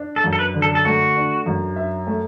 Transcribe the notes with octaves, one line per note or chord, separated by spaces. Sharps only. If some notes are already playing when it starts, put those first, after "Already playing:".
Already playing: D4
A4
F#2
A4
B4
D3
A4
A4
A3 F#4
D4
F#2
E5
A3